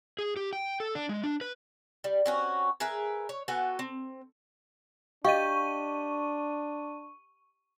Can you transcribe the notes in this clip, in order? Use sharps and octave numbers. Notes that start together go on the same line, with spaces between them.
G#4
G4
G5
A4
D4
G#3
D4
B4
G3
C4 C#4 F#4
G#4 A#4 B4 E5
C#5
B3 F#4 A4 G#5
C4
D4 G4 D#5 F5 C#6 D#7